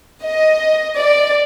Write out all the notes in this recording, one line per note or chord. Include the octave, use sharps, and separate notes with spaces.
D#5
D5